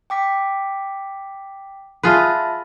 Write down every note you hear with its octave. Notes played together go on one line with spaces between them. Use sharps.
G5 D6 B6
F4 G#4 B4 E5 A5 B5